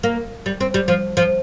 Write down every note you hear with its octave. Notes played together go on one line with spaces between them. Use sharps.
A#3
G3
C4
G3
F3
F3